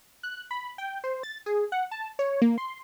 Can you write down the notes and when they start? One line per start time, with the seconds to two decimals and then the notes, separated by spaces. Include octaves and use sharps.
0.23 F#6
0.51 B5
0.78 G5
1.04 C5
1.23 A6
1.46 G#4
1.72 F#5
1.91 A5
2.19 C#5
2.42 A#3
2.58 C6